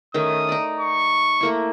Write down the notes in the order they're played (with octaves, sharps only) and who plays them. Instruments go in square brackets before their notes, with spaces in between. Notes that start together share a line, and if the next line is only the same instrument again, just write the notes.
[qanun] D#3 A3 C#4 [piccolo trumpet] D#6
[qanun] D#4 D5
[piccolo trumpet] C#6
[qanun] A3 A#3 E4